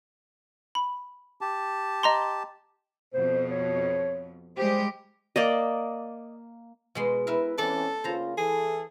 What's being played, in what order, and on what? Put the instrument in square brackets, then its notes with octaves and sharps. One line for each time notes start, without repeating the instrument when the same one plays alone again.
[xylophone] B5
[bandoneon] G4 A5
[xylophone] D#5 A#5 C6
[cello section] F2 B2 [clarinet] C5
[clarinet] C#5
[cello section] G3 G#3 G4 [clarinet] C5
[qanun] A#3 D5 D#5
[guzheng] B2 G#3 C6
[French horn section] E4 [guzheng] A#4 B4 E5
[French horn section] E3 C4 C#4 [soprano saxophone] A4 [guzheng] D5
[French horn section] C#3 A#3 F4 [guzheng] C5 A#5
[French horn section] E3 A4 [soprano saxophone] G#4